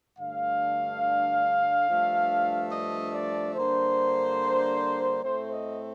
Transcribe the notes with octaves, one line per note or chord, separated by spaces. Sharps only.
G2 D3 A3 D4 F5
G2 F3 A3 D4
D#5
D5
D3 G3 A#3 D4 C5
A2 A3 C4 C5
D#5